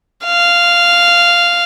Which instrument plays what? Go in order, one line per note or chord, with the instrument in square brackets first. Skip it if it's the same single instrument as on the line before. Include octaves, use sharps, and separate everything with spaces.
[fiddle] F5